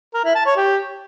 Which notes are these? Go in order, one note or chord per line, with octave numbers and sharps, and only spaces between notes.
A#4
E4
A5
C#5
G4